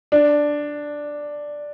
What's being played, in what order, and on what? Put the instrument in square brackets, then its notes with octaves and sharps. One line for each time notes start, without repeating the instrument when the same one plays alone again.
[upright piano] D4